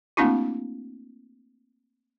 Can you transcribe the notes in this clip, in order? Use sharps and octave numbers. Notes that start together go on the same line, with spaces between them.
A3 A#3 C4 D4 E4 F#4